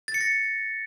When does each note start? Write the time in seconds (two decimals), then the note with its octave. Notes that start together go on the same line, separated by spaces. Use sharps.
0.08 A6
0.14 C#7
0.21 A#6